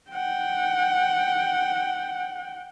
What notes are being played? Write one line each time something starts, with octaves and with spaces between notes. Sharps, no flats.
F#5 G5